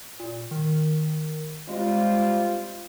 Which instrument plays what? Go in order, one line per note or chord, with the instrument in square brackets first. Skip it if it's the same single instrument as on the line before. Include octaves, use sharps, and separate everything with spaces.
[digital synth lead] A#2
D#3
[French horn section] G3 C4 F4 [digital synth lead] G#3